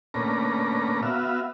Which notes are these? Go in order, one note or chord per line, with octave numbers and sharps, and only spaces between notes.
A#2 D3 A3 C#4 B4 A#5
B3 F#4 E5 F5